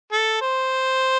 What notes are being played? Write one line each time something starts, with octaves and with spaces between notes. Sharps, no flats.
A4
C5